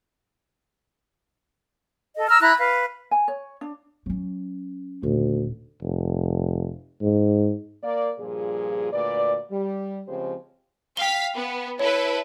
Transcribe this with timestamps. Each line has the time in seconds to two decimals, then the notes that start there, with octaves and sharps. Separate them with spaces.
2.16 A4 D#5
2.29 A#5 E6 F6
2.42 E4 A#5 B5 F#6
2.58 B4 F5
3.11 G#5
3.28 C#5
3.61 D4
4.06 F#3 C#4
5.03 D#1 D2
5.82 F1
7.02 G#2
7.82 A#3 D5
8.18 G2 A#2 F3 G#4
8.92 D2 A#2 B4 D5
9.51 G3
10.07 C#3 F3 G#3 C4 G4 C5
10.97 F5 G5 B6 G7
11.36 B3
11.79 E4 A4 B4 C#5